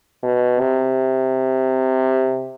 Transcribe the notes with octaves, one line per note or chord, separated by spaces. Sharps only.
B2
C3